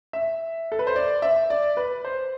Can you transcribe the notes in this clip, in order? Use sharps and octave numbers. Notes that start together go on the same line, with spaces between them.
E5
A4
B4
C5
D5
E5
D5
B4
C5